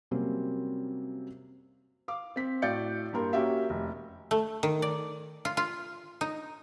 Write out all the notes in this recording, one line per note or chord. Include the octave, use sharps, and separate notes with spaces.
C3 F#3 G3 A#3 C4 C#4
F5 D6
C4 B6
A2 F#4 D5 G6 C#7
G2 A#3 A#4 C6
A#3 C#4 F#4 G4 E5 F5
F1
A3
D#3
D5
F4
F4
D#4